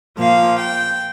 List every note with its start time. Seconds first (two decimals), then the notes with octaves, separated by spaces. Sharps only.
0.17 A#2 F3 A#3 F5
0.59 G5